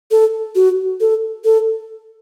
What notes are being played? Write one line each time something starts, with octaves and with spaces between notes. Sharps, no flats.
A4
F#4
A4
A4